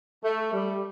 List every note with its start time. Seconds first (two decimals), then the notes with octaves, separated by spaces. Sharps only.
0.24 A3
0.53 G3